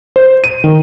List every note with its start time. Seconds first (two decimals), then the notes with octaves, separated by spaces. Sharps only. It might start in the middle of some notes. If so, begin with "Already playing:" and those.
0.16 C5
0.44 D#7
0.64 D#3